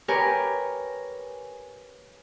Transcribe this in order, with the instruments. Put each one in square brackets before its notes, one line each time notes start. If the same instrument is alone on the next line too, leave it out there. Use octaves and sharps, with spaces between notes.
[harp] G4 A#4 B4 C#5 G#5